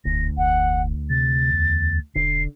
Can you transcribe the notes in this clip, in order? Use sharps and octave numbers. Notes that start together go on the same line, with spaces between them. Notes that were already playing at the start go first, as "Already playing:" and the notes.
E1 D2 A#6
F1 F#5
C3 A6
E2
E1 D3 C7